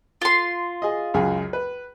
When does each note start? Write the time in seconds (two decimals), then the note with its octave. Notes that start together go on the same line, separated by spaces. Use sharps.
0.21 F4 C6
0.82 G#4 D#5
1.14 C#2 F#2 G#4
1.53 B4